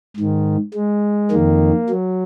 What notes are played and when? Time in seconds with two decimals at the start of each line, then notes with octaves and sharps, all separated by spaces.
0.16 G#2 D#3
0.74 G#3
1.31 F2 D#3 A#3
1.89 F#3